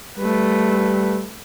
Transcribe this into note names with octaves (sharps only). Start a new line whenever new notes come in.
G3 A3 B4